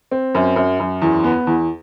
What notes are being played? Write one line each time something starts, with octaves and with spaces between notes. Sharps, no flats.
C4
F#2
F#2
F#2
E2
B3
E2